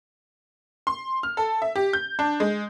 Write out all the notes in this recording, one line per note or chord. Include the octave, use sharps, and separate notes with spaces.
C6
F6
A4
E5
G4
G6
D4
G#3